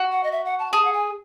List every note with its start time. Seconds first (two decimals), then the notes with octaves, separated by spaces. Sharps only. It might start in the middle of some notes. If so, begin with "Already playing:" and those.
Already playing: F#4
0.12 F#5
0.24 D#5
0.32 E5
0.45 F#5
0.59 A5
0.73 G#4 A5
0.85 F#5
0.93 G#5